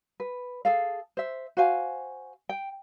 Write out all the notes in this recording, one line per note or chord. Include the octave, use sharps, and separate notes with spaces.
B4
G#4 A4 F5
C5 E5
F#4 C5 F5 G#5
G5